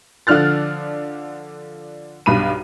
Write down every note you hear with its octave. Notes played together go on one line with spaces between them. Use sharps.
D3 F3 D4 F6 F#6 A6
B1 G2 B5 D#7